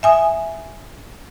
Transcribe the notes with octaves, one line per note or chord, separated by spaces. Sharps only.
E5 G#5 D#6